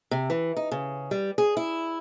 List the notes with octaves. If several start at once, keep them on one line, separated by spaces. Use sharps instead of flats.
C3
E3
D#4
C#3
G3
G#4
E4